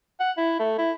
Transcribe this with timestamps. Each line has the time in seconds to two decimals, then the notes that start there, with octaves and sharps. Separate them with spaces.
0.20 F#5
0.37 E4
0.59 A3
0.78 E4